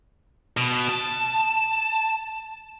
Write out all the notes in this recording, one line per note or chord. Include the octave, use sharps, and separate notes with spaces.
B2
A5